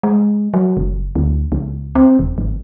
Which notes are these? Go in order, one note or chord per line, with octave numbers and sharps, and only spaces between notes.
G#3
F#3
F#1
D2
C#2
C4
E1
G#1